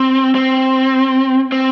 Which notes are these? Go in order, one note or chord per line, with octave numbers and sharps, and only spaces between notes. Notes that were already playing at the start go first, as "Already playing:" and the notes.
Already playing: C4
C4
C4